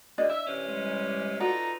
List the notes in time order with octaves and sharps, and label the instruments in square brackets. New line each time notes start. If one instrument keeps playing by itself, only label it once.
[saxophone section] F#2 A#2 G#3 [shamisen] D4 D5 D#5
[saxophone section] E5
C3 E3 C#4
[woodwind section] G3 G#3
[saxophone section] D#4 A4 D5 [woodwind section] F4 B4 A#5 [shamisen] F#4